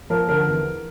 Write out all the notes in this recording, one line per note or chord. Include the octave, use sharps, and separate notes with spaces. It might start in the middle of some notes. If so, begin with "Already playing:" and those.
F3 A#4
D3 A#4
E2